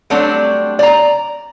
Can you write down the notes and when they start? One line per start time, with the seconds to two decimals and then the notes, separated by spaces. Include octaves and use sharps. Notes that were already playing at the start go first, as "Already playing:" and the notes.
0.10 F#3 G3 A3 C4 D4
0.79 D5 A#5